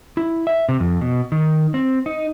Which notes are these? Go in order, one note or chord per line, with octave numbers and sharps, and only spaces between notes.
E4
E5
C3
F2
B2
D#3
C4
D#4